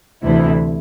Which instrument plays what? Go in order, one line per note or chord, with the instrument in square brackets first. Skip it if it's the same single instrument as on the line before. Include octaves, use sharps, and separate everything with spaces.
[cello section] D2 C3 E3 E4